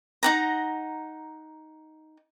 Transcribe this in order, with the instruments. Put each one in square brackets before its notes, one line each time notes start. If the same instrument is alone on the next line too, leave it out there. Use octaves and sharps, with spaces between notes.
[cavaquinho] D#4 F#5 A#5